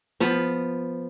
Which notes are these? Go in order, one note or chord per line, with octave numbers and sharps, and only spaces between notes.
F3 B3